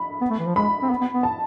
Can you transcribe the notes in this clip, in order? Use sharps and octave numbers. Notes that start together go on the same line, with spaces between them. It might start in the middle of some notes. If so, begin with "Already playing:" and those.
Already playing: B5
B3
A3
E3
F3
G#3 B5
C4
B3
B3
B3
A5